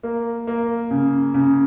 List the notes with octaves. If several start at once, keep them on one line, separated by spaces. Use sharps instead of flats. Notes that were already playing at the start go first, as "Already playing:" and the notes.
A#3
A#3
C#3
C#3